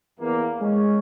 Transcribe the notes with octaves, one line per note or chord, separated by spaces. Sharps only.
E2 A#3
G#3 C#4